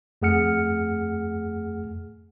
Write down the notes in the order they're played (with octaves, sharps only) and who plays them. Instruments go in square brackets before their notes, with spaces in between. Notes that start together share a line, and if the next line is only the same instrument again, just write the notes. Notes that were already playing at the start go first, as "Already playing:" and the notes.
[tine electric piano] F2 A3 G#4 F#5 F6 C#7